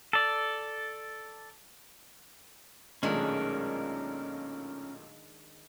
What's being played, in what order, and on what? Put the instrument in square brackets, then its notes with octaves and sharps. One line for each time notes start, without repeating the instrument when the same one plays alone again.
[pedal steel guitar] A4 D5
[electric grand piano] B1 A#2 A3 [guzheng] D#3 G#3 D4 [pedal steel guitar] C#4 A#4